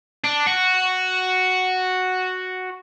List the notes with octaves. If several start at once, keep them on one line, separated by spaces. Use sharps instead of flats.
D4
F#4